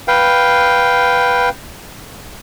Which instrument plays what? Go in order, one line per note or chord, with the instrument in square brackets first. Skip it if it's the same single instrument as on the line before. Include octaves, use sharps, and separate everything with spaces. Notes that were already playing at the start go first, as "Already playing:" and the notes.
[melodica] B4 F5 G5